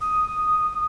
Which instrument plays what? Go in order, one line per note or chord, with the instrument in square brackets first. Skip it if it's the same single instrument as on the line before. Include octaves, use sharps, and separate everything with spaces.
[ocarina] D#6